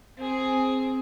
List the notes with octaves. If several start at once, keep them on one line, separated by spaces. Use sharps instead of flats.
C4 G#4